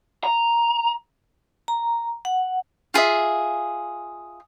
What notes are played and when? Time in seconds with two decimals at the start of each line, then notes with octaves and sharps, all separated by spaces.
0.24 A#5
1.68 A#5
2.25 F#5
2.94 F4 G#4 D#5 E5